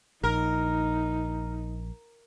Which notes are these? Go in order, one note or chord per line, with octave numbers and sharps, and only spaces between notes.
A#1 D#4 A#4